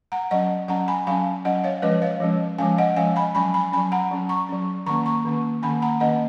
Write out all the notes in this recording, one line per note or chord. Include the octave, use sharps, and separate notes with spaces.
F#5 A#5
F#3 C#4 D#5 F#5
F#3 C#4 F#5 A#5
G#5 B5
F#3 C#4 F5 G#5
F#3 C#4 D#5 F#5
C#5 F5
F3 G#3 C#4 B4 D#5
C#5 F5
F3 G#3 C#4
F3 G#3 C#4 F5 G#5
D#5 F#5
F3 G#3 C#4 F5 G#5
G#5 B5
F#3 C#4 G#5 B5
G#5 B5
F#3 C#4 G#5 B5
F#5 A#5
F#3 C#4
A#5 C#6
F#3 C#4
D#3 A#3 C#4 A#5 C#6
A#5 C#6
D#3 A#3 C#4
D#3 A#3 C#4 G#5 B5
F#5 A#5
D#3 A#3 C#4 D#5 F#5